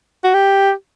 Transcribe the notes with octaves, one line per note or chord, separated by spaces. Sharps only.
F#4
G4